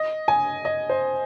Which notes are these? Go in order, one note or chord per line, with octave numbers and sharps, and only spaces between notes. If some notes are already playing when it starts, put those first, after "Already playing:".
Already playing: D#5
G#5
D#5
C5